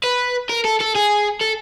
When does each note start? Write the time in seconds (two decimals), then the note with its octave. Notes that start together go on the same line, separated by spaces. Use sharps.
0.04 B4
0.49 A#4
0.64 A4
0.80 A4
0.95 G#4
1.41 A4